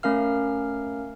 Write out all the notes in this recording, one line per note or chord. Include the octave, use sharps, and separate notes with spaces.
A3 C#4 A#4 F5 F6